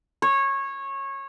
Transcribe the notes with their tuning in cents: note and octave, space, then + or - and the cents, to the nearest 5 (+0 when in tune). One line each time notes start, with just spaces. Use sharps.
C#5 -20